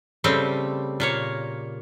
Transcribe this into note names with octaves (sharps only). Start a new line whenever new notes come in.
C#3 G3 A3 C4
A#2 A#3 C#5